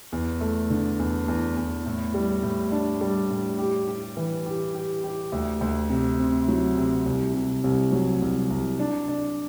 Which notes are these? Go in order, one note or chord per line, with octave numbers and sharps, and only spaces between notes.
E2
A3
D3
E2
E2
E2
A2
G3
A2
D4
G3
A2
G4
G4
E3
G4
G4
G4
D2
D2
C3
C4
F#3
C3
C2
C3
C2
F#3
C2
C2
D4
D4